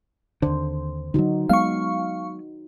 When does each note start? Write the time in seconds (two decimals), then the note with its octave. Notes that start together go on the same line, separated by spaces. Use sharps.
0.42 D#2 D3 C5
1.14 D3 F#3 D#4 F#4
1.49 F#3 G#3 B3 F5 C#6